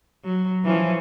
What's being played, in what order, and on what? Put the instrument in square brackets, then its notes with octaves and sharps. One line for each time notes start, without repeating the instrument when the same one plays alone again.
[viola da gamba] F#3
E3 F3 C#4